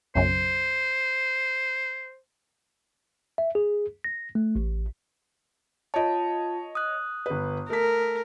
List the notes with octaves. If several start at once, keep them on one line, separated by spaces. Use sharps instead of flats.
B1 F#2 C#3 C5
E5
G#4
A#6
A3
A1
F4 C#5 D#5 A5
D#6 F#6
G1 B4
A3 A#4 B6